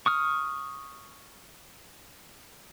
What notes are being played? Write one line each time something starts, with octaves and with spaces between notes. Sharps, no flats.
C#6 D#6 F6